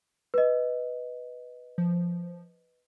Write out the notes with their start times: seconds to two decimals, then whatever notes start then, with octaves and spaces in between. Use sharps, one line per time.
0.34 B4 D#5
1.78 F3